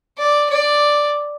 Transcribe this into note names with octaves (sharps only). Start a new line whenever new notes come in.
D5
D5